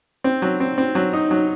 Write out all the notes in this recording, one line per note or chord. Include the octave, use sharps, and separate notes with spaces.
C4
F#3
C4
C4
F#3
D#4
F#3